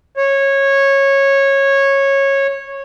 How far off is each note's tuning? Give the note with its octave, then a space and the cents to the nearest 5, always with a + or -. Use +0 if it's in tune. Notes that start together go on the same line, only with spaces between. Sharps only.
C#5 -15